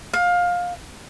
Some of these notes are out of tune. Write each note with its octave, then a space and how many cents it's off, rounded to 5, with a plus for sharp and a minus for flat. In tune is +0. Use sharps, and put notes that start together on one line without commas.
F5 +20